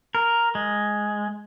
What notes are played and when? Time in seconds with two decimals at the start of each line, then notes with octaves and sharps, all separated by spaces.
0.15 A#4
0.55 G#3